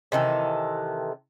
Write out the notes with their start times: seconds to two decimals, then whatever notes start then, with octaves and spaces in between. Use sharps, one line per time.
0.12 C3 D#3 E3 A4